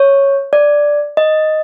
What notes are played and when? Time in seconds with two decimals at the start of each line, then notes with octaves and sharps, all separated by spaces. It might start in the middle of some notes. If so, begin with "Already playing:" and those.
Already playing: C#5
0.53 D5
1.17 D#5